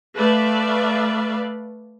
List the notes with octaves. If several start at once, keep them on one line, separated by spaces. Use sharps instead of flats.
A3 B4 D5 E5 F5